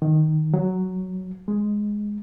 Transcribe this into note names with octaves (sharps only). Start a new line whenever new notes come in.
D#3
F#3
G#3